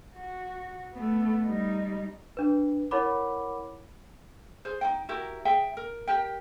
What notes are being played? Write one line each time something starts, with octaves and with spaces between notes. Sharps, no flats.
F#4
A3 B3
G3 D#4
D4 B4
E4 A#4 C#5 F#5 B5 D6
G#4 C5
D#4 F#4 G5
E4 F#4 G4 A#4
G#4 E5 G5
A#4
G4 A#4 G5